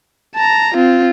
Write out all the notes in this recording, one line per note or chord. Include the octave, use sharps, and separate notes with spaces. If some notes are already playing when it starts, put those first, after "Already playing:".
A5 A#5
C4 F4